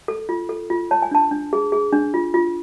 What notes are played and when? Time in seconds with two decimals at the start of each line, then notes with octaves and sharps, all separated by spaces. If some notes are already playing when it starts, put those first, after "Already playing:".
0.08 A4
0.29 F4
0.49 A4
0.70 F4
0.91 C#5 A5
1.02 G#5
1.11 D4 A5
1.31 D4
1.53 G#4
1.72 G#4
1.93 D4
2.14 F4
2.34 F4